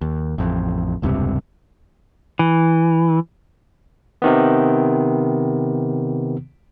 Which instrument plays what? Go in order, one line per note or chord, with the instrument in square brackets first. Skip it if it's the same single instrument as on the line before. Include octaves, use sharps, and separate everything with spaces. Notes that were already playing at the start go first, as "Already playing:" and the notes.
[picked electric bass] D#2
A1 F2
E1 C#2 G2 C3
[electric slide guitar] E3
[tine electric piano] C3 D#3 B3